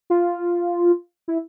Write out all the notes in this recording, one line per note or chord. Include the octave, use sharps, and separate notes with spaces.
F4
E4